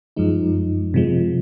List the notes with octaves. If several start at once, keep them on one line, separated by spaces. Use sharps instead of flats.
F#2 F3 G#3 D#4
C3 F3 G#3